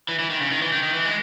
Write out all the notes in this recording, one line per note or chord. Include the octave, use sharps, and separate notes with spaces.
E3
E3
D#3
C#3
D#3
E3
D#3
D#3
E3
G#3